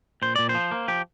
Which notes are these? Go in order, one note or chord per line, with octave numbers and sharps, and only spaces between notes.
A#2 C5
A#2 D5
C5
F3
A#3
F3 G4